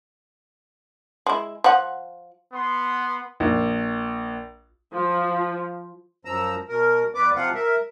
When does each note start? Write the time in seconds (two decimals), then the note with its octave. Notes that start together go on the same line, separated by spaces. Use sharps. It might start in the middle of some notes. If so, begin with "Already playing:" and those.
1.26 G#3 E4
1.64 F3 F#5
2.53 B3 C6
3.40 A#1
4.93 F3
6.25 F#2 F3 A#5 E6
6.69 B2 A#4
7.15 E2 B4 D5 D6
7.36 C3 F3 C4 F4 F5 F#5
7.54 A#4 E5